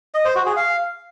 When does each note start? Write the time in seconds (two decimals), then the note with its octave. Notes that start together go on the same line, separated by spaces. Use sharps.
0.14 D#5
0.25 C5
0.35 F#4
0.46 G#4
0.56 F5